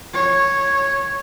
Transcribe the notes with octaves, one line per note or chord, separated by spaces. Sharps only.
C#5